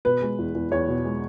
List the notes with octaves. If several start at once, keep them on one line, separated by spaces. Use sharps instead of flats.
B2 B4
G#3
E2
E2
E2 C#5
B2
G#3